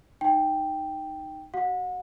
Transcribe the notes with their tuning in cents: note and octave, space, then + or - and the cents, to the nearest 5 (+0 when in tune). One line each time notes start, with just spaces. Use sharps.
D#4 -10 G5 +0
F#4 +30 F#5 -35